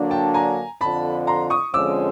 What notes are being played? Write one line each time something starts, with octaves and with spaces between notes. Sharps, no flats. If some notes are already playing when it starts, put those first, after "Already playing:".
Already playing: D3 F#3 A#3 D4
G5 A5
G#5 A#5
F2 D3 F3 A5 B5
A#5 C6
C#6 D#6
F2 D3 F3 G#3 C#4 D6 E6